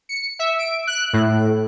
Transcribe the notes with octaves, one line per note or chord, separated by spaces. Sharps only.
C#7
E5
D7
F#6
A2